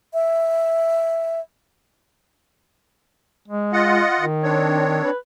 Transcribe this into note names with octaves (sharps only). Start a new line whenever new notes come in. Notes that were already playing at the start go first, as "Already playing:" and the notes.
E5
G#3
F4 D#5 F#5
D#3
C4 D4 C#5
B4